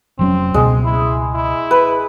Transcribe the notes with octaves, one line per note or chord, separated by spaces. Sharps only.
F1 F#3 C4 C#4
C#2 B2 G#3
E4
E4
B4